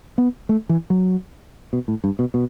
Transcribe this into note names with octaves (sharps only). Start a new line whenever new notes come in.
B3
A3
E3
F#3
B2
A2
G2
B2
B2